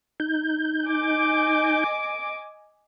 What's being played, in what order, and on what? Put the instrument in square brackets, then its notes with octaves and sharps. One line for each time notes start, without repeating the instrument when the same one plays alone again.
[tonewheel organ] D#4 G6
[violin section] D#5 G#5 D6